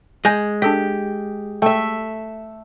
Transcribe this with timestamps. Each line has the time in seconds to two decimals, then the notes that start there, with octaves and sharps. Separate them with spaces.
0.25 G#3 G#5 G6 A#6
0.62 D4 G4 A4 B6
1.62 A3 E5 G5